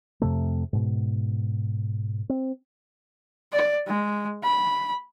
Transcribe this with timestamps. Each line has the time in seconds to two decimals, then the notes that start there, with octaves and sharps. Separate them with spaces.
0.21 F2 C3 A3
0.73 G#2 B2
2.29 C4
3.52 D5
3.87 G#3
4.43 B5